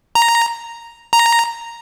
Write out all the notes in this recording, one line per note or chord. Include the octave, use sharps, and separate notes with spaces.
A#5
A#5